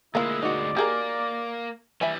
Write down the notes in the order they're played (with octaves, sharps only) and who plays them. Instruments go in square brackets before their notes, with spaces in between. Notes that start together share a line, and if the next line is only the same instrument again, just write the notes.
[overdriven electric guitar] D2 G#3 [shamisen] A#3 F4 [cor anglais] E4
[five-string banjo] D#4 F#4 [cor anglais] D5
[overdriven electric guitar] A#3 [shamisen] G4 G#4 A#4
[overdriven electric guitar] E3 G3 [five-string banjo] E5 G#5 B5